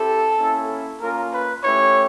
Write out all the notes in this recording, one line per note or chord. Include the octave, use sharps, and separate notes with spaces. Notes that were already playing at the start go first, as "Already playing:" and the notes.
Already playing: C4 E4 G4 A4
A#3 C#4 E4
A#3 C#4 F4 A#4
B4
A3 C#4 E4 G4 C#5